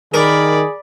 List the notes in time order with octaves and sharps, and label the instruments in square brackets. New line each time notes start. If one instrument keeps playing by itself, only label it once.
[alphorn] D#3 [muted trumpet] G#4 [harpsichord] A#4 [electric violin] D5 B5